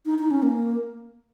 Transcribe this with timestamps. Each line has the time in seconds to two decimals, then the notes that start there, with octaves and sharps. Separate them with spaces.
0.06 D#4
0.19 D#4
0.31 C#4
0.43 A#3